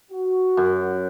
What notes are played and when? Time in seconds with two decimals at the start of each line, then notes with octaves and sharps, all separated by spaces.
0.11 F#4
0.57 F#2